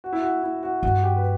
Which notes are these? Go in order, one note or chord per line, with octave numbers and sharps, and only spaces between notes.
F#4
E4
F#4
E4
F#4
G2 F#4
G4
B4